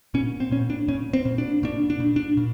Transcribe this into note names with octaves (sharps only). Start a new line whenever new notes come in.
A#2 C#4
C4
A#2 C#4
D4
A#2 C#4
C4
A#2
D4
A#2 D4
D4
A#2
D4
A#2